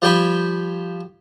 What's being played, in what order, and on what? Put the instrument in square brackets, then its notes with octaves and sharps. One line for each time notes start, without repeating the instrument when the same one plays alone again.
[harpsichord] F3 G3 G5 G#5 B5